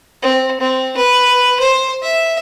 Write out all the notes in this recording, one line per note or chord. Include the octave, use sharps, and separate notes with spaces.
C4
C4
B4
C5
E5